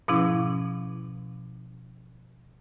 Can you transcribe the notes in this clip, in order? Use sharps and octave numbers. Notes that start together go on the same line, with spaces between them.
G#2 B2 F3 C#4 E4 D6